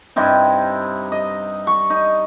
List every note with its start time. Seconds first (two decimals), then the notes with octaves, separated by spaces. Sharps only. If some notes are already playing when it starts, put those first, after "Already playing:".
0.16 G2 C3 D#4 E4
1.12 D#5
1.67 C#6
1.90 D#4